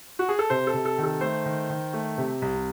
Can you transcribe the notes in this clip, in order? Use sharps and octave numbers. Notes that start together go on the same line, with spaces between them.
F#4
G#4
A4
C3 C5
A4
C3
A4
D#3
A4
A3 C5
D#3
D#3
A3
C3
C2